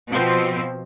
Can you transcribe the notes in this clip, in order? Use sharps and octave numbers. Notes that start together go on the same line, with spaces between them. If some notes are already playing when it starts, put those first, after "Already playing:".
B2 F3 C4